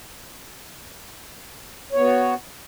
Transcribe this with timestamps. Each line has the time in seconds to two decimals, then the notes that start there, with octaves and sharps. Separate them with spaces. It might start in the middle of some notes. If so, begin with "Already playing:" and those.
1.92 C#5
1.96 B3
2.00 F#4